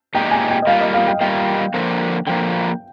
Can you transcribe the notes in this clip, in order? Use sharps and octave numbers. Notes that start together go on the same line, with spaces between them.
A#2 G#3 D#4 G4 G5
G#5
G5
D#5
G3 A#3 F4 F5
D#5
F5
G5
G3 A#3 F4 G5
D3 F3 A#3
D3 F3 A#3 G5